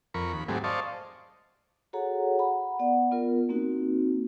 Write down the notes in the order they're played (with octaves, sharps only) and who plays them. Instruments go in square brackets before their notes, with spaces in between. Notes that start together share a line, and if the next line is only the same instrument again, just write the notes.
[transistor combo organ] F2 A#4 B5 C#6
D#2 B5
G#2 F#3 A3 C4 G4 G#4
C5 D5 D#5 F5 A5 C#6
[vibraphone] F#4 G#4 A4 C#5 F#5 A#5
F#5 A#5 B5
B3 D5 F#5
B3 F4 A#4
A#3 C4 D#4 F#4